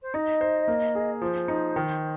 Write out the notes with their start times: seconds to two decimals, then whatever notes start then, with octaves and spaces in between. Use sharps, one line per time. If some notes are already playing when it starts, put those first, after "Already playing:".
0.02 C5
0.14 D#4 D#5
0.41 C5
0.68 A#3
0.95 G#4
1.22 F3 C5
1.48 D#4
1.76 D#3